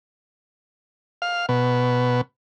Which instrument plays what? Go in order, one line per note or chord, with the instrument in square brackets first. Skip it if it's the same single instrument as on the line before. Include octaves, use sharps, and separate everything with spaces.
[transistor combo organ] F5
B2